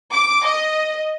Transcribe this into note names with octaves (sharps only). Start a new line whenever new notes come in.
D6
D#5